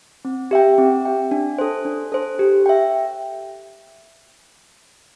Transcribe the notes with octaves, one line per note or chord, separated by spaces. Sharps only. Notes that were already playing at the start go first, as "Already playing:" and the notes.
C4
G4 E5 G5
C4
G4 E5 G5
D4
A4 C5
D4
A4 C5
G4
E5 G5